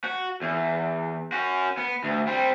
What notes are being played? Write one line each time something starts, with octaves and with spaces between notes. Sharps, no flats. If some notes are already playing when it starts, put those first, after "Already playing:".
F#4
E2
C#4 F#4
B3
D2
G3 C4